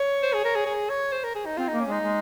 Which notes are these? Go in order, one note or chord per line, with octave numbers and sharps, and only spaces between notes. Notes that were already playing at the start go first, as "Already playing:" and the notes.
Already playing: C#5
C5
G#4
A#4
G#4
G#4
C#5
C5
A#4
G#4
D#4
C4 F4
A#3 D#4
C#4
G#3 D#4
G#3